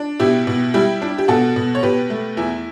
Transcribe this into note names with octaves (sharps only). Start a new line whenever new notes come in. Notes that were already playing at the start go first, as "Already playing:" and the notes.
Already playing: D4
B2 E4 G4
B2
G3 E4 G4
D4
G4
B2 F#4 A4
B2
C#5
B2 G4 B4
A3
E2 E4